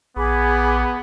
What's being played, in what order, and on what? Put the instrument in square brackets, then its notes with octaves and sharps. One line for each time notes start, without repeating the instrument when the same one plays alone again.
[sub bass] A#1 [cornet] B3 [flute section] G#4 B5 D6